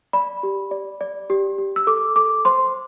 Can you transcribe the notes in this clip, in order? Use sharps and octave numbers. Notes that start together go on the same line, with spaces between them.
D5 B5
G4
D5
D5
G4
G4
E6
A4 D6
A4 D6
C5 C6